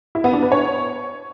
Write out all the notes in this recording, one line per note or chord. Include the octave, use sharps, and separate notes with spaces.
E4
B3
D4
B4
C#5